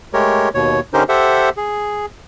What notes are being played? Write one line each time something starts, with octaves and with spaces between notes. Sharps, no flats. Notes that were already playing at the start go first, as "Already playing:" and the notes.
G#3 A3 G4 A#4 C#5
D#2 B2 C#5
D3 C#4 D#4 G4 A#4 C5
G4 A4 C5 E5 F#5
G#4